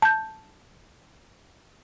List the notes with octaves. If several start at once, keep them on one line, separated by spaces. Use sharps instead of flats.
A5 G6